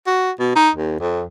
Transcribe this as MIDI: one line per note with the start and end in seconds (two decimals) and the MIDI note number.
0.07 0.31 66
0.39 0.54 47
0.56 0.70 63
0.76 0.98 39
1.00 1.24 41